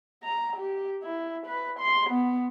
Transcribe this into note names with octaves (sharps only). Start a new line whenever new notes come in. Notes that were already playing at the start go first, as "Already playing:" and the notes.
A#5
G4
E4
B4
C6
B3